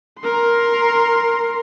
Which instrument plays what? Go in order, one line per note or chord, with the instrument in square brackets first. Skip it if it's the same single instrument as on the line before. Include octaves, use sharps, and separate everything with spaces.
[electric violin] A#4 C6